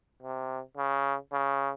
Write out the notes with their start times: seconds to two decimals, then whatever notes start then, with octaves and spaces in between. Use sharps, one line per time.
0.23 C3
0.77 C#3
1.33 C#3